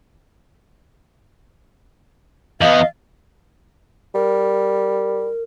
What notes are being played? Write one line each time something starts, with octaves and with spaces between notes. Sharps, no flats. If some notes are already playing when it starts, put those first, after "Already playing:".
E2 B3 D#5 F5
G3 A#4